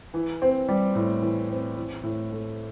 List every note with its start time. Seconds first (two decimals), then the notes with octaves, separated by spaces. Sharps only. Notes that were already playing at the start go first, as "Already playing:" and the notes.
0.14 E3
0.42 C4
0.68 G3
0.95 A2
1.22 E3
1.50 C4
1.77 E3
2.03 A2
2.32 A3